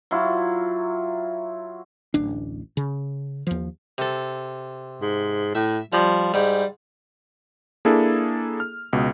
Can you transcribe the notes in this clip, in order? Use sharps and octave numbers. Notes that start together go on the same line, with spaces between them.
F#3 E4 F4
D1 A1 D4
C#3
D#2 F3
C3 A4
G#2
A2 E5
F3 G3
G#2 G3
A#3 D4 E4 G#4 A4
F6
C#2 B2